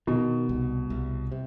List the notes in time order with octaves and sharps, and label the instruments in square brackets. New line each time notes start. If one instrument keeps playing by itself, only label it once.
[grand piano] B2 [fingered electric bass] D#3
[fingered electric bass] C2
C2
C3